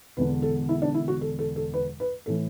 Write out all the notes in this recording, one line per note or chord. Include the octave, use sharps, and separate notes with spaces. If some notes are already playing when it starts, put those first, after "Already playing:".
E1 E2 D3 B4
A4
E4
D4
E4
F#4
A4
A4
A4
B4
B4
A2 E3 A4